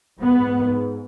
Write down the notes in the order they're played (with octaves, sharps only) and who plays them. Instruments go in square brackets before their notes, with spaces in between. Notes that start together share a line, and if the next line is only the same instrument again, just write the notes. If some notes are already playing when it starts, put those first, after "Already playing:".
[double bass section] G#2 B3